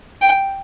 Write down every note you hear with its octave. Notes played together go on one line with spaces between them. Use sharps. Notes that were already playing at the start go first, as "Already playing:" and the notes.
G5